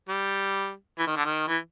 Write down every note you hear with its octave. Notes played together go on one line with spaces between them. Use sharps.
G3
E3
D#3
D3
D#3
E3